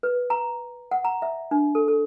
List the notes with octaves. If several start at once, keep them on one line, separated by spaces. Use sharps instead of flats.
B4
A#5
F#5
A#5
E5
D4
A4
A4